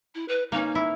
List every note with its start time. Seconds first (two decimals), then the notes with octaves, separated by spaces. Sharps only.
0.15 E4
0.28 B4
0.52 A#3 C#4 D#4
0.75 E4